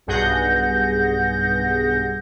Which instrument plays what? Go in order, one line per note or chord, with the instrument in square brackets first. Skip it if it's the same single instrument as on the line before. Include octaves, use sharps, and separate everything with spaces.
[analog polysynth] B1 G2 G#4 F#5 G6 A#6